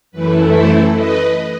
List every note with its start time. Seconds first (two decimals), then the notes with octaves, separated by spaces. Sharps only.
0.12 F#2 E3 A3 E4 B4
0.52 A4 C5
0.93 B4 D#5